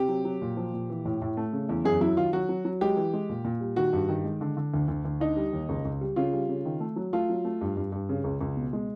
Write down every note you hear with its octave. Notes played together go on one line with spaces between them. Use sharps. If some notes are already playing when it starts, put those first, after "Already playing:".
Already playing: C3 G4
F#3
F#3
A#2
F3
A#2
E3
A2
A2
A3
C#3
E2
F#2 G#4
F#3 E4
D#3 F4
F#3 F#4
F#3
F#3
G#3 G4
E3
G#3
A#2
A#2
G3
D#3 F#4
G2
D#3
G#3
D3
D3
D2
D2
D2
D3 D#4
G3
D#2
C#2
C#2
G3
C#3 F4
G3
C#3
D#3
A3
F#3
A3 F4
F#3
A3
G2
G2
G2
C#3
C#2
C#2
B2
G#3